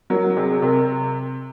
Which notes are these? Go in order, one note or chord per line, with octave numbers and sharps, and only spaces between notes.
F#3 A#4
C3 G#4
C3 A#4